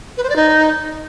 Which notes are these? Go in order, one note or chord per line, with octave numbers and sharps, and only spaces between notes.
B4
C5
D5
D#4